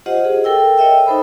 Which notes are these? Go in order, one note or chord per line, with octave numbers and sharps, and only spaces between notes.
F4 G4 C5 D#5 F#5
G#4
A4 A#4 G5 E6
C#5 D#5 E5 G5
D#4 A4 C5 B5